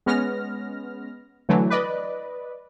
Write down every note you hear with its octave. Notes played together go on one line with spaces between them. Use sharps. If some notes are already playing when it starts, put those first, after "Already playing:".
G#3 B3 C#4 F6 A#6
D3 E3 F#3 A3
B4 D5 D#5